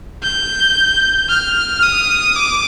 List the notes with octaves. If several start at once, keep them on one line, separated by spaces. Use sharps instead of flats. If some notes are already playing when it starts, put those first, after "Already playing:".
G6
F6
D#6
D6